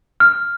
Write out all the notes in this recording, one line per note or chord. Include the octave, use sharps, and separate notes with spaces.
F6